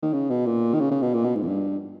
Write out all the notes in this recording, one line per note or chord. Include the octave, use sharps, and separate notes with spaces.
D#3
C#3
B2
A#2
D#3
C#3
C#3
B2
A#2
B2
G#2
E2
G2